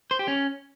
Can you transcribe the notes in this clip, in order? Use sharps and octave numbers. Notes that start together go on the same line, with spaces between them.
C5
G4
C#4